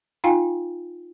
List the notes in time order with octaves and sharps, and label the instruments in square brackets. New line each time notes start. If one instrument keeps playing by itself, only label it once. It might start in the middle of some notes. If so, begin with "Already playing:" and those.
[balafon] D#4 F4 F5 G5 G#5